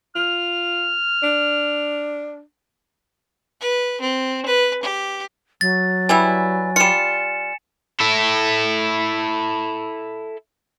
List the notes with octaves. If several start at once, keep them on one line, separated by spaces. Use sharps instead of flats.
F4 F6
D4
B4
C4
B4
G4
F#3 A6
E3 G3 E4 G#5
G3 F4 C#7 E7
E4 A4